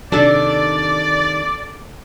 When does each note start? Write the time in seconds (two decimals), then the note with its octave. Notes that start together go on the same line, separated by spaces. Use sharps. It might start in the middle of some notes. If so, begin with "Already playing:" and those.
0.12 C3 D#3 D4 A4 D5